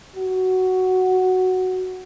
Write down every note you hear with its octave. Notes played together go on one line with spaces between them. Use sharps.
F#4